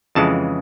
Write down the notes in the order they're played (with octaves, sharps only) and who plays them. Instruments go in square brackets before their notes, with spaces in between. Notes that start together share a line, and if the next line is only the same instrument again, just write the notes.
[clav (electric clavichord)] F2 C#3 E3 G#3 A5